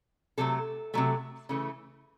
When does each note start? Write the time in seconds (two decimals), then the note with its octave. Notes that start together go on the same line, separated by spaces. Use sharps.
0.38 C3 F#3 A3 A4
0.94 C3 F#3 A3
1.49 C#3 E3 A3